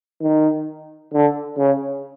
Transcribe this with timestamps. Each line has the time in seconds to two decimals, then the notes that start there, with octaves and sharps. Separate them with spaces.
0.22 D#3
1.13 D3
1.58 C#3